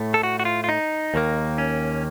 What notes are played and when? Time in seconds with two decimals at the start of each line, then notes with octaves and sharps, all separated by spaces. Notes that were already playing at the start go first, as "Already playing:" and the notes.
Already playing: A2 A3
0.14 A4
0.23 F#4
0.40 F#4
0.45 F4
0.64 F4
0.69 D#4
1.14 D#2 D#3 A#3
1.58 C#4